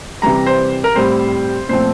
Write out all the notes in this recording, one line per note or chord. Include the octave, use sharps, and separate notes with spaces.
C3 E3 G3 A#5
C5
A#4
A2 G3 C4 C5
A#2 F3 A3 C4 C5